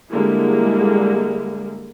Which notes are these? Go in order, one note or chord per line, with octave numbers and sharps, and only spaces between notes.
D3 G3 G#3 A#3 E4